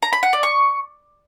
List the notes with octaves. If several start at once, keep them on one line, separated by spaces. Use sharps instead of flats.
A#5
B5
F#5
D5
C#6